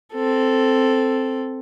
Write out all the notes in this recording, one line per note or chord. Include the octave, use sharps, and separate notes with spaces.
C4 A4